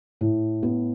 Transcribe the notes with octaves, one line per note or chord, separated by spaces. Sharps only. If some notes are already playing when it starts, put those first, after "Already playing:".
A2
B3